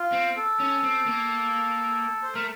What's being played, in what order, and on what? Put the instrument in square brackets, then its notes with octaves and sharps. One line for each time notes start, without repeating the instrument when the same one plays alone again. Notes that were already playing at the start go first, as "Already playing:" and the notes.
Already playing: [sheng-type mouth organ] F4
[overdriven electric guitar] C4
[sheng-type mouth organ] A4
[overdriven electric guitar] C#4
C4
A#3
[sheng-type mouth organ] C5
[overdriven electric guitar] A3 [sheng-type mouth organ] A#4